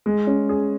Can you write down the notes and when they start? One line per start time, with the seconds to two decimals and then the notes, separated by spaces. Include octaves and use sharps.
0.06 G#3
0.27 C#4
0.49 G#4